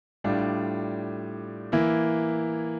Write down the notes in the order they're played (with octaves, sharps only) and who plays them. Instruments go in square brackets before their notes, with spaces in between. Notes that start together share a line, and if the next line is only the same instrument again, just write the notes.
[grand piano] A2 G3 D4 F4
E3 A#3 E4